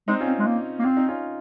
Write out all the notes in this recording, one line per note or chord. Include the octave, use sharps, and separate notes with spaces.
G#3 C4 D#4
C#4 F4
C4
G#3
A#3
A#3
C4 F4
D#4
C#4 F4